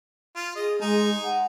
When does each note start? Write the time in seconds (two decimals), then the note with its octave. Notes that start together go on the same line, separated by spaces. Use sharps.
0.36 F4
0.56 G#4 D#5
0.81 G#3 D#4 G#5
1.25 F#5